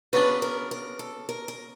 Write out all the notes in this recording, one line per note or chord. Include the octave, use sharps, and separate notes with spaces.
C#3 F#3 B3 D4 B4
A#4
A#4
A4
A#4
A#4